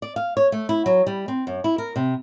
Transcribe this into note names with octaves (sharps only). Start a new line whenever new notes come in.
D5
F5
C#5
A3
E4
F#3
G3
C4
F#2
E4
A#4
C3